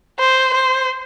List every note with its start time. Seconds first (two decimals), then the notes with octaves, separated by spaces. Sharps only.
0.20 C5
0.54 C5